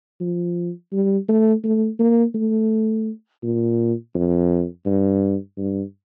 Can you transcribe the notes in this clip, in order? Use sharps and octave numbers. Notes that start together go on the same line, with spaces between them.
F3
G3
A3
A3
A#3
A3
A#2
F2
G2
G2